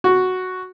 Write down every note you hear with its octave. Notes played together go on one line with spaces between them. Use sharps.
F#4